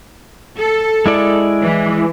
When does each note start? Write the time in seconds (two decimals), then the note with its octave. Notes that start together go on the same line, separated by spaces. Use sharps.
0.58 A4
1.06 G#3 E4 D5
1.63 E3